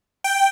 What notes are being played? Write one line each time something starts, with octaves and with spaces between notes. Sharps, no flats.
G5